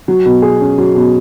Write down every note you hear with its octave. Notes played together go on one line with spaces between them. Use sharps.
F#3
B2
G#4
C#4
F#3
B2